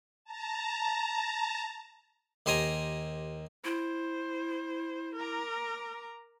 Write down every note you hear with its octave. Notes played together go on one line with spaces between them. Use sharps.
A5 A#5
D#2 G4 C5 D#5 G#5 A#5
E4 C5
A#4 A#5 D6